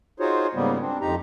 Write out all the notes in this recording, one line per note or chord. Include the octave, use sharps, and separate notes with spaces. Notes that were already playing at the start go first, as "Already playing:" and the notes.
D#4 F4 F#4 G#4 C5 C#5
G#2 C#3 G3 A#3 B3
C4 D4
F2 D#4 G4 A#5